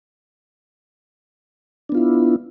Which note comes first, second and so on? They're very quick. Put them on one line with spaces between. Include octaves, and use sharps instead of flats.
D4 B3 F4 E4